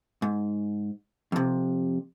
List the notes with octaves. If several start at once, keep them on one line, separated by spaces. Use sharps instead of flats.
G#2
F2 C3